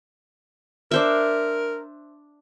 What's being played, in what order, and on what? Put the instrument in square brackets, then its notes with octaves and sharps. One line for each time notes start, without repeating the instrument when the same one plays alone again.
[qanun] D4 C5 E5 [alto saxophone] A#4